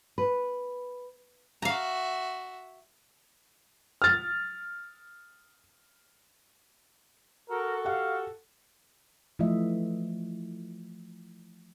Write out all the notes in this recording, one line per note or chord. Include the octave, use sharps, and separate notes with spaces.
B4
F#4 E5 F5 A#5
F6 A6
F#4 A4 A#4
G4 F5 F#5
E3 F3 A3 F4 D#5 E5